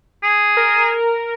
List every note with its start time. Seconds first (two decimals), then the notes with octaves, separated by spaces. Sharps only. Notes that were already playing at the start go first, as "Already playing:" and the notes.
0.23 G#4
0.57 A#4